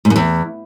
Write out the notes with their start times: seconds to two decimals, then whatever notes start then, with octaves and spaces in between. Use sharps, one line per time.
0.05 G#2
0.10 F#2
0.16 E2